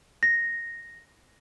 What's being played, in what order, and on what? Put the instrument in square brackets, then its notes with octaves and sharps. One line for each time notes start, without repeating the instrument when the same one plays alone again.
[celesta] A#6